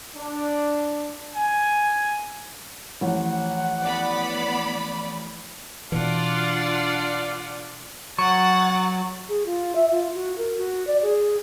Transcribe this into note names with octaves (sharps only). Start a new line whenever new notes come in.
D4
G#5
A1 F3 F#5
B3 D5 B5
B2 E3 D4 F4 D5 F#5
F#3 F#5 C#6 A6
G#4
F4
E5
F4
F#4
A#4
F#4
D5
G#4